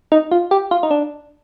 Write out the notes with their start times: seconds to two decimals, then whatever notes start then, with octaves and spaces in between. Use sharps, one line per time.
0.12 D#4
0.32 F4
0.51 G4
0.71 F4
0.83 D#4
0.91 D4